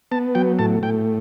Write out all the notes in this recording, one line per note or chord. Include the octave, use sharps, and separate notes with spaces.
B3 A5
F#3 G5
A2 A5
A2 G5